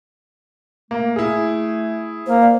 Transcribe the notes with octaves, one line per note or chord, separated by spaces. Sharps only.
A3 A#3
E4 G#4
A#3 C5
D5